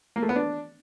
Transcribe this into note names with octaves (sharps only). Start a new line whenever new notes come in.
A#3
A3
B3
D4